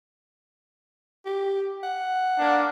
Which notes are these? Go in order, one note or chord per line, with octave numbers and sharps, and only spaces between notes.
G4
F#5
A#3 D4